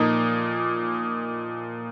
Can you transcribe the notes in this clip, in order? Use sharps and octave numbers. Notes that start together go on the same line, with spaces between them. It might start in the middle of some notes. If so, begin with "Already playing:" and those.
Already playing: A#2 F3 A#3 D#4